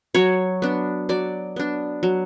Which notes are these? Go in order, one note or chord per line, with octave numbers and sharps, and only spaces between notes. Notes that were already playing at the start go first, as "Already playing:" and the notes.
F#3 C#5
B3 D4
F#3 D5
B3 D4
F#3